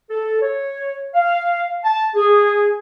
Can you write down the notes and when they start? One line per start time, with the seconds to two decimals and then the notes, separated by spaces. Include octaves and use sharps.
0.10 A4
0.41 C#5
1.14 F5
1.84 A5
2.15 G#4